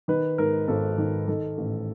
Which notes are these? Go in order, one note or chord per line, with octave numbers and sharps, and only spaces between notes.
D#3 B4
G#2 A#4
G#1 A4
D#3
D#3 A4
A1